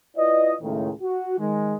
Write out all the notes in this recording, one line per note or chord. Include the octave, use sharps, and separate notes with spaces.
E4 F4 B4 D5 D#5
C#2 A2 D#3
F#4
D#3 G#3